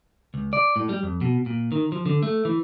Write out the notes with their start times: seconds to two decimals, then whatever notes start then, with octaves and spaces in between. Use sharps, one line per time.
0.34 C#2
0.53 D5
0.76 A2
0.89 G3
1.03 F2
1.21 B2
1.46 A#2
1.72 D#3
1.92 F3
2.06 D3
2.23 A3
2.45 E3